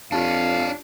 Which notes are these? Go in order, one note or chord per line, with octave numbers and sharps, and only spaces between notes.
F2 D4 F4 G4 C#5 F5 A5